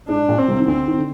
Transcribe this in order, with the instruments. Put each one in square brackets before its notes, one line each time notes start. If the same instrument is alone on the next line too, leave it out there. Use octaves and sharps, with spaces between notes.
[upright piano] G#2 [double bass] D4
[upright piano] A#1 A#2
[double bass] C4
[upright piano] C2 C3
D#3
[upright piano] D2 D3 [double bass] C4
[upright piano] D#3
D3